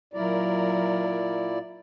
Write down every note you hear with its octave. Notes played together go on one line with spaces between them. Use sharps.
A#2 F#3 E4 A#4 D5